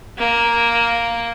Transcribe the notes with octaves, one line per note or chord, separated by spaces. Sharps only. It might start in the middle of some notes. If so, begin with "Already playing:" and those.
A#3